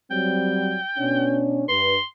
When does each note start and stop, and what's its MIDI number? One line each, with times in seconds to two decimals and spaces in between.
0.11 0.77 54
0.11 0.77 55
0.11 0.77 60
0.11 1.39 79
0.98 1.66 47
0.98 1.66 61
0.98 1.66 62
1.69 1.95 43
1.69 1.95 71
1.69 2.04 84